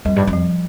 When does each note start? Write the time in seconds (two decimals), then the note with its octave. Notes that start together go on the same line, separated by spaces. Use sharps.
0.05 F2 G3
0.16 G2
0.27 F2
0.33 F3